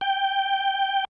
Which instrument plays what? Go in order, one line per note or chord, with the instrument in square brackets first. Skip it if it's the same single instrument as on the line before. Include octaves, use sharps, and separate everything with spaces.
[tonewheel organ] G5